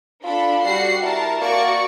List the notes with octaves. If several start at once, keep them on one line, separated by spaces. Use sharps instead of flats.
D4 F4 A4 B5
G3 F#4 F#5 C7
E4 A#4 A5
A#3 F#4 D5 C#6